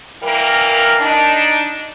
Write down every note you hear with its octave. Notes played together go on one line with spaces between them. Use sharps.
E3 G3 A#3 A#4
D4 D#4